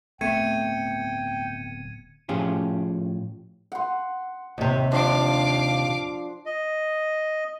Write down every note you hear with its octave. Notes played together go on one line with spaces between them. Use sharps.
D1 A3 B3 C4 G5 G#6 C#7 D#7
A2 F3 C#4 F4 G4 G#4
F#5 C6
D#2 C3
F3 D4 C5 F5 D6
D#5